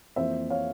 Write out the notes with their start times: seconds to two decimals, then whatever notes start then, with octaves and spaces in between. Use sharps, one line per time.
0.16 F2 E3 A#3 C5 E5
0.50 C#5 F5